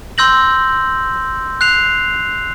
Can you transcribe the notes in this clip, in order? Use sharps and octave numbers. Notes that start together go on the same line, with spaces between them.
C6 E6 G6 A#6 F#7
F#6 C7 F7